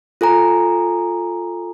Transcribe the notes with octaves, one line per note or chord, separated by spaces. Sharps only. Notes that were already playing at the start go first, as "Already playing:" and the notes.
F4 A4 G#5 A#5